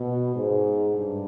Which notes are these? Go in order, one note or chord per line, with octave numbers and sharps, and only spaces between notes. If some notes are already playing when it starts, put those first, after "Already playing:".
Already playing: B2
G#2
G2